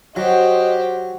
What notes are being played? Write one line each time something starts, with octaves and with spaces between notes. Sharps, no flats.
F#3 F#4 G4 C5 D#5